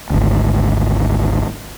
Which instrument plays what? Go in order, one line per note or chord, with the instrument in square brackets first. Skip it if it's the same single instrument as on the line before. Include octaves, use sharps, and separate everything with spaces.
[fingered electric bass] G#1 D2